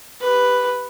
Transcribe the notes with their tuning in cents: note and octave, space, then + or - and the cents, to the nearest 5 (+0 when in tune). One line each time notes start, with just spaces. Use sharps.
G4 +0 B4 +0